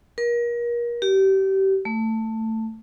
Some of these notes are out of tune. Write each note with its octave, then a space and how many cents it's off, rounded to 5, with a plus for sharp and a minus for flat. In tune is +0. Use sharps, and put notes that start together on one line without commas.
A#4 +35
G4 -30
A3 +15